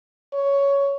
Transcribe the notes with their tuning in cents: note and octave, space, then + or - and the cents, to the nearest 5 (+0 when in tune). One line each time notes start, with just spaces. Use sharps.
C#5 +10